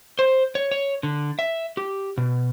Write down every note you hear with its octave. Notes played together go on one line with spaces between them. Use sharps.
C5
C#5
C#5
D3
E5
G4
B2